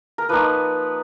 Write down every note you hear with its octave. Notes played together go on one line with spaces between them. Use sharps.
A#4
F3 A#3 D#4 B4